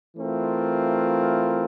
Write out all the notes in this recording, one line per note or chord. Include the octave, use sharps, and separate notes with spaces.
E3 A3 C4 F4 A#4